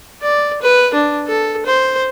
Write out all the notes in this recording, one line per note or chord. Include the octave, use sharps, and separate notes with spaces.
D5
B4
D4
A4
C5